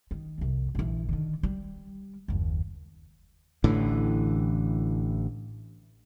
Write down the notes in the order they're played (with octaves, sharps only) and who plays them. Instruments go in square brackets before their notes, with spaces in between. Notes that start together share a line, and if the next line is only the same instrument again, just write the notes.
[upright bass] D#3
C2 F2
A#1 E3
D3 D#3
G3
F#1 D#2
[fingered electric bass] A1 A2 D3 E3